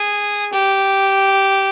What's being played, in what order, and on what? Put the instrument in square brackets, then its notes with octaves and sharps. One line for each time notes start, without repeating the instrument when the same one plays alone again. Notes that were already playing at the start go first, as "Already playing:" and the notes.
Already playing: [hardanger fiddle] G#4
G4